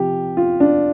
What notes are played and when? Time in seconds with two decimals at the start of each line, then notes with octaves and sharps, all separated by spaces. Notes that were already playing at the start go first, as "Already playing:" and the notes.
Already playing: C3 F3 G4
0.37 F4
0.60 D4